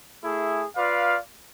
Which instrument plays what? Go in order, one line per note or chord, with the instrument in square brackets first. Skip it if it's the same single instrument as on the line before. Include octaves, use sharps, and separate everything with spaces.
[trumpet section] A3 E4 G#4
F4 B4 D5 F5